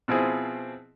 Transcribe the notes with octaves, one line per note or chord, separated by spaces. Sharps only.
B2 F3 C4 E4 G#4